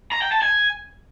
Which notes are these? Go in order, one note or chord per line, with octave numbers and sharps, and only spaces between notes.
A#5
G5
A5
G#5